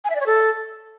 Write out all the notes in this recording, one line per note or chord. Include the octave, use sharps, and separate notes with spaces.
G#5
E5
D5
C#5
A4